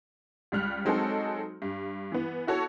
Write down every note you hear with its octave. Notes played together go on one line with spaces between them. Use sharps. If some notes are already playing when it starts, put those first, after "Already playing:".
C#2 G3 F6 F#6
F#3 G#3 C4 D#4 F#4 A4
G2
E3 B3
E4 F#4 A4 C#5